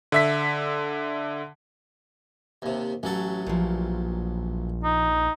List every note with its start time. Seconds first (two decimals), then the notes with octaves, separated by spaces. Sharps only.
0.12 D3 E5 B6
2.62 D#2 C3
3.03 A1 F#3 C#4 A4
3.47 A#1 A#2 F3
4.84 D#4